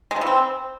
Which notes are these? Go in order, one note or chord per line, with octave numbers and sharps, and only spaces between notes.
G#3
F3
E3
C4